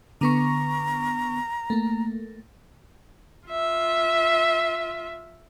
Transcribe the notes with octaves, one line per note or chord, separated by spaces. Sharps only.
D3 B3 A#5 C#6
A3 A#3
F4 E5